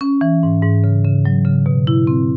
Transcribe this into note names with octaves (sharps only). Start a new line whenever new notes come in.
C#4
E3
G#2
G#2
C#3
C#3
F#3
C#3
B2
E4
C4